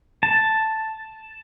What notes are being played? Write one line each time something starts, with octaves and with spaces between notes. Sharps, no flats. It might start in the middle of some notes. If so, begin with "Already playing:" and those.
A5